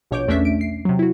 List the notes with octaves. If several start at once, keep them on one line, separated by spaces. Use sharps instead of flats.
A#1 B2 C#5 D6 G6 D7
E2 A3 C#4 D4 E5 B6
D7
C7
C3 F#3
E4 F#4